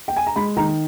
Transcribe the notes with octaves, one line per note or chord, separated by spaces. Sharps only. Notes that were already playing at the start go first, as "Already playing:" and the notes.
G5
G#5
A#5
G#3 B5
D#3 A#5